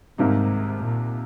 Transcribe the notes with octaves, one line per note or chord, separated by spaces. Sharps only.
C2 G#2 C3 D#3 A#3 D#4
A#2